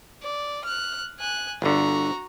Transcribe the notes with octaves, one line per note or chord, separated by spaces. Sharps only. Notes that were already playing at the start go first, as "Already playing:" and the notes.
D5
F6 F#6
G#5 F#6
G1 D3 F#4 A#5